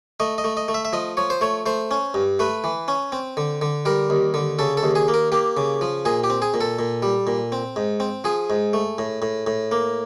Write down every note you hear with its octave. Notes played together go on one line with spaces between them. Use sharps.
A3 D#5
D#5
A3
D#5
A3
E5
E5
F3 D#5
F3 C#5
C5
A3 C#5
A3 C5
C#4
G2
A3 B4
E3
C#4
C4
D3
D3
G3 A#4
D#2
D3
C#3 A4
A4
D#2
G#4
A#3
A#4
A#3 G4
C#3
F3
A#2 G#4
G4
C4
G#4
A#2
A4
A#2
G3
A#2
C4
G#2
C4
F3 G#4
G#2
A3
A2
A2
A2
A#3